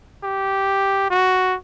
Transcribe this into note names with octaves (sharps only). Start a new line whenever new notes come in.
G4
F#4